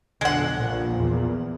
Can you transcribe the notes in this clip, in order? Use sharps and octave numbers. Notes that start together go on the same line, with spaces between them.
B1 F2 D3 G#3 F#5
A#1 A#2 F3
E2